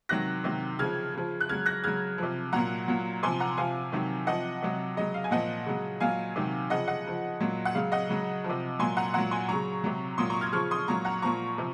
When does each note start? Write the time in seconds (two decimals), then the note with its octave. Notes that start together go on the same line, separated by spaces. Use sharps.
0.09 C3 D#3 F#3 F#6 A#6
0.44 C3 D#3 F#3
0.79 C#3 F3 F6 G#6
1.15 C#3 F3
1.41 F#6
1.49 C#3 F#3 F6 G#6
1.66 F#6 A#6
1.84 C#3 F#3 F6 G#6
2.18 C3 F3
2.53 A#2 F#3 F#5 A#5
2.88 A#2 F#3
3.23 C3 F3 G#5 C6
3.40 F#5 A#5
3.57 C3 F3 F5 G#5
3.92 C3 D#3 F#3
4.27 C3 F3 D#5 F#5
4.62 C3 F#3
4.97 C#3 F#3 D#5
5.14 F5
5.24 G#5
5.31 A#2 F3 D#5 F#5
5.66 C#3 F#3
6.00 A#2 F#3 F5 G#5
6.36 C3 D#3 F#3
6.70 C#3 F3 D#5 F#5
6.88 D#5 F#5
7.06 C#3 F3
7.40 A#2 F#3
7.65 F#5
7.75 C#3 F#3 F5
7.92 D#5 F#5
8.09 C#3 F#3
8.44 F3
8.49 C3
8.79 A#2 F#3 G#5 C6
8.97 F#5 A#5
9.14 A#2 F#3 F#5 A#5
9.31 G#5 C6
9.49 C#3 F#3 A#5 C#6
9.84 C3 F#3
10.18 A#2 F#3 C6 D#6
10.30 A#5 C#6
10.41 F6 G#6
10.53 C#3 F3 C#6 F6
10.71 C6 D#6
10.88 A#2 F#3 A#5 C#6
11.05 F#5 A#5
11.22 A#2 F3 A#5 C#6
11.58 C3 F3